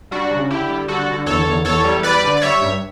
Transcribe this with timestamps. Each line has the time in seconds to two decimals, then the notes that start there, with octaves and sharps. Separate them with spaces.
0.11 G3 D4 F#4
0.31 C#3
0.50 D3 E4 G4
0.70 G3
0.88 D3 F#4 A4
1.08 D3
1.26 E2 A4 C#5
1.47 E2
1.65 E2 A4 C#5
1.84 G3
2.03 G3 B4 D5
2.24 D3
2.37 D5
2.42 G3 C#5 E5
2.61 G2